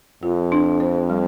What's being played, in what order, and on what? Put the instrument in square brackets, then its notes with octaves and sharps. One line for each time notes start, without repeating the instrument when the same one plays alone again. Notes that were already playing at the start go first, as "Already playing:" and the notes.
[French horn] F2 [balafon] F4
[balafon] D4
C5
G3